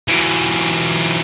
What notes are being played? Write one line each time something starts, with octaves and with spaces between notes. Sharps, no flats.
E3 F#3